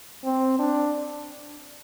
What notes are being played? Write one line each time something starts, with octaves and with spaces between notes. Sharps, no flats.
C4
D4